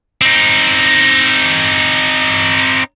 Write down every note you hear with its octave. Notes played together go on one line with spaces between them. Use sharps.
C4 D#4